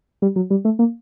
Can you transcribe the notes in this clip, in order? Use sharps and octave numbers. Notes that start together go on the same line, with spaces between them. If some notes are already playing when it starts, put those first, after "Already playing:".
G3
F#3
G3
A3
A#3